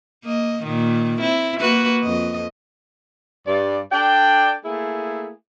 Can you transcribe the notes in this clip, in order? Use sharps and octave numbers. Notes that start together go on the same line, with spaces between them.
A#3 D#5
A#2 D#3
C4 E4
A#3 F#4 B4
F2 D#5
G2 D5
D4 A4 D5 G5
A3 A#3 E4 G#4